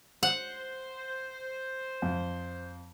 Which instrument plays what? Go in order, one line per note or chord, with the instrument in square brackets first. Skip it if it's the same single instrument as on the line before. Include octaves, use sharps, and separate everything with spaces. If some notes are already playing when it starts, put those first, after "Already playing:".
[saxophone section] C5 [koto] F#5
[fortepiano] F2